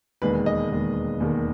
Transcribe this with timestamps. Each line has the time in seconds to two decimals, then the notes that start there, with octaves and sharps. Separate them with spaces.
0.22 E1 D#2 D#3 G#3 B4
0.46 D#5
0.71 E1 D#2 D#3 G#3
1.20 E1 D#2 D#3 G#3